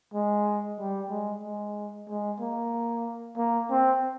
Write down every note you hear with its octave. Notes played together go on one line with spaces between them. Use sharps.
G#3
G3
G#3
G#3
G#3
A#3
A#3
C4